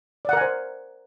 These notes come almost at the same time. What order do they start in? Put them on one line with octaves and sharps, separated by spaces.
D5 F#5 A#4 G#5 C5